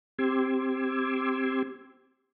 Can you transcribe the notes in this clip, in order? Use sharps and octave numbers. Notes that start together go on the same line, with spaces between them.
C4 G4 C6 D6 E6 G#6